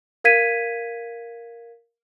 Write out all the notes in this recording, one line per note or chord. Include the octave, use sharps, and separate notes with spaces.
A#4 F5 G#6 B6 D#7